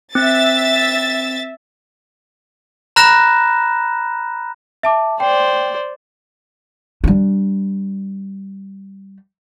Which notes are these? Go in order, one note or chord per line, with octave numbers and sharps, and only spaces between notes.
C4 E5 A6
A#5 B5 F6 F#6 A#6 E7
E5 A5 D6
C5 D5 G5
G3 D4